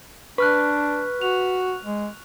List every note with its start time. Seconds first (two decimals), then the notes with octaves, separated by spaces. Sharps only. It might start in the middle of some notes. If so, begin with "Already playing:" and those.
0.38 D4 B4 C#6 F6 F#6
1.22 F#4 F7
1.85 G#3